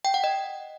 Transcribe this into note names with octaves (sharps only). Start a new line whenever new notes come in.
G5
F#5
D#5